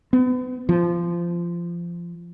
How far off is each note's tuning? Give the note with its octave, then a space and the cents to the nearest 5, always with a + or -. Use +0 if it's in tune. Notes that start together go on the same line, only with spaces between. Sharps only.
B3 +35
F3 -20